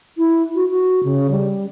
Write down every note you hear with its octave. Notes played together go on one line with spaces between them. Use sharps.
E4
F#4
F#4
C#3
G3